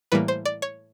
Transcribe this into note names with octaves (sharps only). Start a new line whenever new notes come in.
A2 E3 G3 A#3 B4
C5
D5
C#5